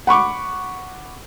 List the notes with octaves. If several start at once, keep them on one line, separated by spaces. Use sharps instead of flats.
F#5 B5 C#6 D6